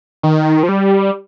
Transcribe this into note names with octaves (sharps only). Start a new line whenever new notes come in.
D#3
F3
G3